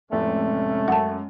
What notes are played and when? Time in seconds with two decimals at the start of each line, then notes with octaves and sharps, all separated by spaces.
0.12 F1 A2 C3 G#3 A3 C#4
0.88 F#2 F#5 A5